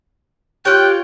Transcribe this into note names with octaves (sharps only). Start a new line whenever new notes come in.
F4 G4 C#5 G5 F#6